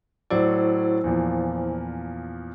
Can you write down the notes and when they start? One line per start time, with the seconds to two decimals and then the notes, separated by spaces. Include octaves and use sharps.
0.30 A2 F#3 E4 C5 D5
1.04 E2 A#2 F3